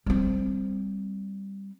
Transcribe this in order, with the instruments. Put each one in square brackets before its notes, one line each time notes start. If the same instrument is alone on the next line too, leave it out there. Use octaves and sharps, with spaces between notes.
[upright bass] G3 C4